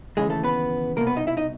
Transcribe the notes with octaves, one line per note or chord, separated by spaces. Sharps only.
D#2 C#3 E3 G#3 G#4
A3 A4
B3 B4
C2 B2 A#3 A#4
B3 B4
D#4 D#5
E4 E5
D#4 D#5